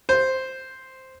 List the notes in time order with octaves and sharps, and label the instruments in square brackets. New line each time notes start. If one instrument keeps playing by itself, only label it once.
[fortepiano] C5